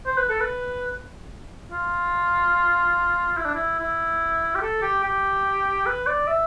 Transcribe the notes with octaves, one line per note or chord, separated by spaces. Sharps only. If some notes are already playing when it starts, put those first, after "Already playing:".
C5
B4
A4
B4
F4
E4
D4
E4
E4
G4
A4
G4
G4
B4
D5
E5